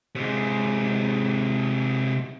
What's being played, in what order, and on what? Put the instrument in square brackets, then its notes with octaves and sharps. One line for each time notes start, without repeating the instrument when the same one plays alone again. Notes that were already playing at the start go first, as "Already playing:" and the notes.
[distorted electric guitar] C3 G#3